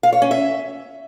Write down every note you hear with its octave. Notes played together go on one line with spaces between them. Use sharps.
F5
C#5
C#4
E5